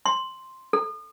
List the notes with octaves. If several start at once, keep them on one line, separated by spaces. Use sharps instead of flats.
C6
A4